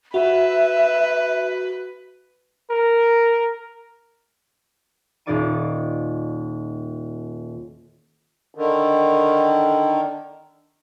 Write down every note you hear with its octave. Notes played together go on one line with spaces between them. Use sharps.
F#4 B4 E5
A#4
D#1 D#4 F4 D5 C#6 D#7
D3 D#3